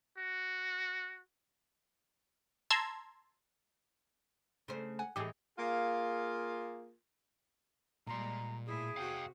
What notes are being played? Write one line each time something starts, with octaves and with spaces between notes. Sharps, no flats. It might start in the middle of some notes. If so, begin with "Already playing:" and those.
F#4
A5 A#5 C6 E6 G#6
C#3 A3 C5
F#5 G#5
A2 E3 D#4 G4 G#4
A#3 F4 G#4
A#2 G3 G#3 A#5 C6
A2 E4 G#4
C3 F#4 F5 G5